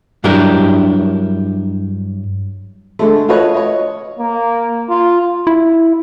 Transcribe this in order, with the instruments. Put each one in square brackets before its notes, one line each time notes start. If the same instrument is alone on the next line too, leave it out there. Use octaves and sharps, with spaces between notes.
[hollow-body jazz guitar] G2 F#3 D4 E4 G4 A#4
[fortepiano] D3 G#3 A3
F4 F#4 A4 B4 C#5 D#5
C#5 D#5
[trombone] A#3
F4
[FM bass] E4